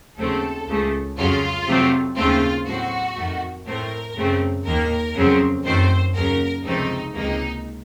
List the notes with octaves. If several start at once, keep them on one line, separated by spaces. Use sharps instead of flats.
D#2 C#3 F#3 A3 C4 A4
C#2 C#3 A3
F2 C#3 F#3 F4
F2 C3 F#3 A3 C4
D#2 C#3 A3 C4 F4
A2 F#3 C4 F#4
F2 D#3 A3
A2 A3 C4 A#4
F#2 C#3 A3 C4
D#2 D#3 A#3 A#4
F2 C#3 F#3 C4
F#2 D#3 A3 C4 C5
D#2 C#3 F#3 A#4
C#2 C3 F3 A3 C4 D#4
C#2 C3 D#3 A#3 D#4